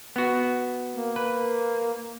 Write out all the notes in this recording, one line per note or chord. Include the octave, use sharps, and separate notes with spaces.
B3 F#4
A#3
B4